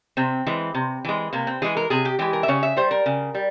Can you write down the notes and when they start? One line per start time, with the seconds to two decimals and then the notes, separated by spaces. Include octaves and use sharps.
0.17 C3 C4
0.47 E3 G#3
0.75 C3
1.05 E3 G#3
1.33 C3 A#3
1.47 C4
1.62 E3 G#3 G#4
1.77 A#4
1.90 C3 G#4
2.05 G4
2.19 E3 G#3 G4
2.33 A#4
2.43 E5
2.48 C#3 C#5
2.63 E5
2.77 G3 C5
2.91 A#4
3.06 C#3
3.35 G3